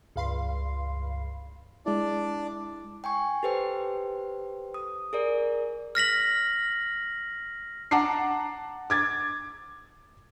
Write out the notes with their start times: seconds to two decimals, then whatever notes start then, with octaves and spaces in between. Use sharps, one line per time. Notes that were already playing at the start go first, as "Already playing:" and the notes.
0.16 C#2 G2 F5 B5 C6 C7
1.86 G#3 D4 E4 D5
3.04 G5 G#5 C#6
3.43 G4 A4 B4 C5 G5
4.74 D#6
5.13 G#4 A#4 D5
5.95 F6 A#6 B6 F#7
7.91 F#5 A5 A#5 D6 C7
8.90 D6 G#6 A6